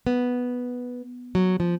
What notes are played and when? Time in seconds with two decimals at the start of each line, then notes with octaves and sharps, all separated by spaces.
0.07 B3
1.35 F#3
1.60 F3